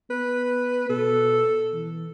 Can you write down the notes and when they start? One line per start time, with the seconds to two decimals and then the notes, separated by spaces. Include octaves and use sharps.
0.10 B3 B4
0.90 B2 A4
1.73 E3